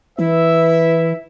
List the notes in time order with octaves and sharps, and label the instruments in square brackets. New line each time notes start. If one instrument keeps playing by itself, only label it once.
[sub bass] E3 [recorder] E4 [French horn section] B4 [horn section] E5